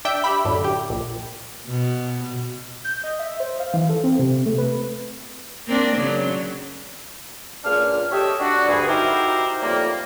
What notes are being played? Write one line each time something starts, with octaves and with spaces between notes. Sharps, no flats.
D4 E5 G5
G4 E5 B5
F#2 A2 D3
G4
A#1
B2
G6
D#5
E5
C5
F5
E3
A4
C4
C3
A3
B4
A#3 C4 D4
C#3 F#3
C#2 A#2 D4 F6
G4 A4 C#5 D#5 E5
D4 F#4
D2 G2 G#4
D#4 E4 F#4 G4 A#4 C5
F2 A2 G3 A#3